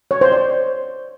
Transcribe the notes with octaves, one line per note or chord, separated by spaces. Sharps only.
C#5
C5
D5